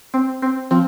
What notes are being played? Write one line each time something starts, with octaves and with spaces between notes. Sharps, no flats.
C4
C4
F3 C4